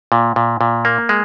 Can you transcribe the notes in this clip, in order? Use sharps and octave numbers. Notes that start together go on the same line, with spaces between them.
A#2
A#2
A#2
A#3
G#3